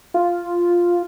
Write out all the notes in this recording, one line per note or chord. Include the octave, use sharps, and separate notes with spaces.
F4